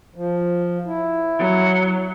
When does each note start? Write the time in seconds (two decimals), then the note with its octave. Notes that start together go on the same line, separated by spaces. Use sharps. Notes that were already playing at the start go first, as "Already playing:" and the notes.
0.16 F3
0.87 E4
1.39 F#3